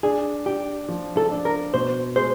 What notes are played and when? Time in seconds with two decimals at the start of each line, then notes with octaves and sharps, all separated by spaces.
0.03 D4 G#4
0.46 D4 G4
0.89 F3
1.17 A4
1.31 D4
1.45 A#4
1.74 B2 C5
2.16 G#3 C5